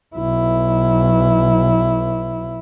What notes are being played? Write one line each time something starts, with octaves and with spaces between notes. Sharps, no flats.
B1 E4